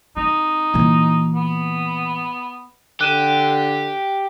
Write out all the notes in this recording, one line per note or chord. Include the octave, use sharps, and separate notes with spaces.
C4 D#4
A#2 E3
B3
D3 G4 F#6 D#7 E7